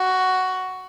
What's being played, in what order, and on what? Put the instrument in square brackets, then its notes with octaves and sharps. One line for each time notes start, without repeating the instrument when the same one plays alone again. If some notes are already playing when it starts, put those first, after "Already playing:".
Already playing: [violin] F#4